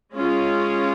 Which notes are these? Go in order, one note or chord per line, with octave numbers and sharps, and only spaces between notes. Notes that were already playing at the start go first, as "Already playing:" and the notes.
G#3 C#4 F4